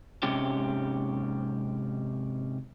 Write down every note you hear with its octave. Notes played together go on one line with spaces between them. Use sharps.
G#2 C3 G#3 C#4 G4